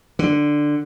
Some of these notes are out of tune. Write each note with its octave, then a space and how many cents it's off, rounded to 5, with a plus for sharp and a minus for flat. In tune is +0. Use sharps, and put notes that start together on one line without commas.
D3 +10